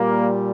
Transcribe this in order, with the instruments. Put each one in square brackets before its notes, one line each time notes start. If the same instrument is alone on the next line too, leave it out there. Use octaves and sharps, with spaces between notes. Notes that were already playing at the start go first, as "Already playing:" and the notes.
Already playing: [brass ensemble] A#2 G3 A#3